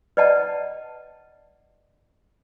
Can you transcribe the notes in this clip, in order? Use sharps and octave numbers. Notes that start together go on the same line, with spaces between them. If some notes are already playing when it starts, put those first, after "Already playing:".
B4 D5 D#5 F#5 A5